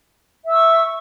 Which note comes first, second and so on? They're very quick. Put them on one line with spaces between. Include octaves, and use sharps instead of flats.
E5 E6 C#6